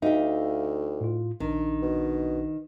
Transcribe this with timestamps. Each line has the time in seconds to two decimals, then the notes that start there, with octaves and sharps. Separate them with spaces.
0.02 D2 D#4 G4 E5 F5
1.01 A2 F4
1.40 A#1 D#3 D4
1.82 B2